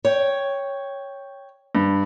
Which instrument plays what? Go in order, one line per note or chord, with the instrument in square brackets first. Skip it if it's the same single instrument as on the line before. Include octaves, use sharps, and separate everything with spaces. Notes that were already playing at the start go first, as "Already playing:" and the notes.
[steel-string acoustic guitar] C#5 G5
[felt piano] G2